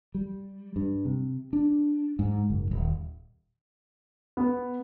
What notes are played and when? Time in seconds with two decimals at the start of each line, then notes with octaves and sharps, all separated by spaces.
0.14 G3
0.76 G2
1.05 C3
1.53 D4
2.19 G#2
2.50 F#1
2.71 D#1
4.37 B3